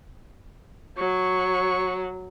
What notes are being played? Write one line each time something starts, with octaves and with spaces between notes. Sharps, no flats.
F#3 C#6